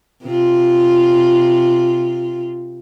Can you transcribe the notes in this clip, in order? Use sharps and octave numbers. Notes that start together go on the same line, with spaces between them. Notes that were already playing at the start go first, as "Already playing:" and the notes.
C3 F4